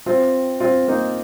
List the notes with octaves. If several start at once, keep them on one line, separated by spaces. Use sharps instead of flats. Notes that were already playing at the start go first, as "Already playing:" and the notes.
C4 F4
C4 F4
A#3 D#4